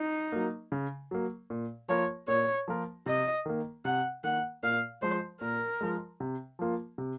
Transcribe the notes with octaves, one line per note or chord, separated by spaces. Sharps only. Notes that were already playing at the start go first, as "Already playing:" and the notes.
Already playing: D#4
F#3 A#3
C#3
F#3 A#3
A#2
F3 A#3 F4 A#4 C#5
A#2 C#5
F3 A#3 F4 A#4
C3 D#5
D#3 A#3
C3 F#5
D#3 A#3 F#5
A#2 F5
F3 G#3 C5
A#2 A#4
F3 G#3
C3
F3 A#3 F4
C3